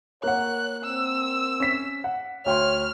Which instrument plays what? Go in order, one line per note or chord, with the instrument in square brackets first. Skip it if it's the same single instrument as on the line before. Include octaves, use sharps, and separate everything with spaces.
[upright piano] A#3 F#5 [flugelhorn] C#5 [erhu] F#6
[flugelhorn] C4 [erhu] E6
[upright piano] C#4 B6
F#5
[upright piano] D2 G5 C6 [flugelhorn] C#5 [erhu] F6